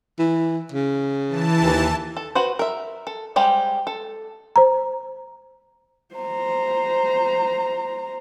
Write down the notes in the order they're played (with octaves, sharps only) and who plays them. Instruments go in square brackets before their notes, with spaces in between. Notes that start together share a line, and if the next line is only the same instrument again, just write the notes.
[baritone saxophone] E3
C#3
[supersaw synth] E3 A5
[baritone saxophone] D#2
[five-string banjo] A4
F#4 B4 C5
A#4 E5
A4
G3 G#3 G4 C5 F5
A4
[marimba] C5 A#5
[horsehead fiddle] C5 A#5